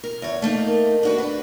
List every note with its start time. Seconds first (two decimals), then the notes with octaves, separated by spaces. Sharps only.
0.04 A#4
0.22 E2 C#5
0.42 A3 A#3 D#4
0.68 A#4
1.03 D4 F#4 B4
1.18 D4 B4